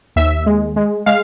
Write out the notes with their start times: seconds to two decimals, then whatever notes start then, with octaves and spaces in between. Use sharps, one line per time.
0.16 D#2 E5
0.46 G#3
0.76 G#3
1.06 G#3 F5